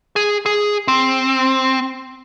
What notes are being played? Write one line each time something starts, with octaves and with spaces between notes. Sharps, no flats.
G#4
G#4
C4